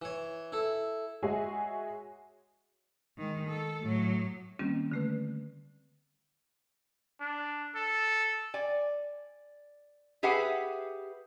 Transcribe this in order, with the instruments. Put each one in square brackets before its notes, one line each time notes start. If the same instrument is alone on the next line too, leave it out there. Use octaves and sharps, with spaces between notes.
[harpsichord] E3 C#5
E4 A4
[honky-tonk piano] G#3 F#4 G#4 C#5 E5 G#5
[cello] D#3 G#3
A4
A2 F#3
[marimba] D#3 G3 A#3 C4 C#4
D3 A3 B4
[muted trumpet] D4
A4
[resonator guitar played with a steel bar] D5 G#5
G4 G#4 B4 E5 F#5 G#5